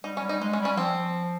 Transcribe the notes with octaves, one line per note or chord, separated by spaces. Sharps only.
G3 D#4
C#4
G3
D#4
G#3 D#4
C#4
G3
C#4
F3 C4